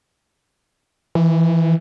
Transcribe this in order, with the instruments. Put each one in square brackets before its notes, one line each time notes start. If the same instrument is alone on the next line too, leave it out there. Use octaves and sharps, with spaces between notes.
[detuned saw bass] E3